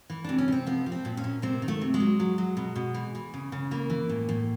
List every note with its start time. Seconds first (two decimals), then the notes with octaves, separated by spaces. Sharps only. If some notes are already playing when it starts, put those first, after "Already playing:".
0.10 E3
0.24 C3 D4
0.38 C#4
0.48 C3 C4
0.67 F3 B3
0.86 F3
0.92 C4
1.05 A#2
1.17 C#4
1.24 A#2
1.42 C3 C4
1.62 D#3
1.68 A3
1.81 C3
1.94 G#3
2.00 F#3
2.20 F#3
2.38 F#3
2.57 B2
2.76 B2
2.94 E3
3.15 E3
3.34 C#3
3.52 C#3
3.71 E3 A#3
3.90 E3
4.09 A2
4.29 A2